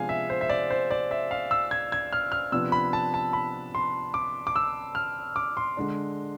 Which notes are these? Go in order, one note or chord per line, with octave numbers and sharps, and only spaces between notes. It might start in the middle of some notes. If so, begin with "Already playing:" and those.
Already playing: C3 F3 G#3 B3 D4 F5 G#5
E5
C5
E5
D5
C5
D5
E5
F5
E6
G#6
G#6
F6
F6
C3 F3 B3 D4 E6
B5
A5
A5
B5
C6
D6
D6
E6
F6
D6
C6
D3 G#3 D4